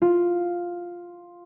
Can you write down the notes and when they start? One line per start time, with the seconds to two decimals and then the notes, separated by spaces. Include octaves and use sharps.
0.02 F4